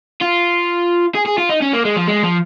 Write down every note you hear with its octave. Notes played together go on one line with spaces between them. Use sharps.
F4
G#4
G#4
F4
D#4
C#4
A#3
G#3
F3
G#3
F3